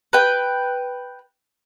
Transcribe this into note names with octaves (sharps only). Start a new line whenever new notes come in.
B4 G5